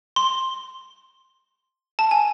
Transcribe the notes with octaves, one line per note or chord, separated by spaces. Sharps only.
C6
A5
G#5